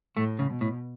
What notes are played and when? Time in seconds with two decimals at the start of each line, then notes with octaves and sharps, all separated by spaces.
0.16 A2 A3
0.39 C#3
0.50 B2
0.61 A2